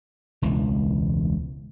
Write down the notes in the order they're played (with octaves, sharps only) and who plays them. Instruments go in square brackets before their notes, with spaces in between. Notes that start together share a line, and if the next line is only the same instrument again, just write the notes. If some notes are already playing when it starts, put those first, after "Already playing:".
[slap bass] E1 C#2 E3